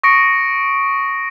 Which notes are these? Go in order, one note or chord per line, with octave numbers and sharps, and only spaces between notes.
C#6 D#6 A#6 C#7 D7